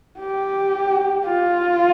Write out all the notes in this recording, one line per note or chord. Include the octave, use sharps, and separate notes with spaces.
G4
F4